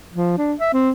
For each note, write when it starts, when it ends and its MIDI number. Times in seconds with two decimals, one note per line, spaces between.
0.13 0.36 53
0.38 0.54 62
0.60 0.71 76
0.73 0.91 60